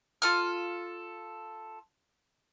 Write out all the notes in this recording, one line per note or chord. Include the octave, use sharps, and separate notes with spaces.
F4 A4 F6